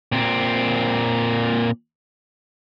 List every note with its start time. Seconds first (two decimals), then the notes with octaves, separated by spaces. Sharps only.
0.12 A#2 C4